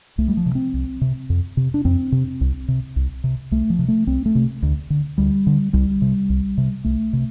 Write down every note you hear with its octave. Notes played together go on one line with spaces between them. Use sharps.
C2 A3
G3
F3
C3
C4
C2
C3
F2
C3
D4
F2 C4
C3
C2
C3
C2
C3
C2 A3
F3
C3
A3
C2 C4
A3
C3
D2
D3
D2 G3
D3
C2 G3
C3
C2
C3
C2 A3
C3